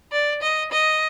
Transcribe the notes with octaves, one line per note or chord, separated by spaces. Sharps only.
D5
D#5
D#5